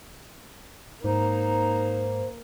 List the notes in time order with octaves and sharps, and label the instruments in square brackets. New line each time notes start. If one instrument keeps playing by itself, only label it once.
[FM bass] G#2 [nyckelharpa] A#3 [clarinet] D#4 [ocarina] C5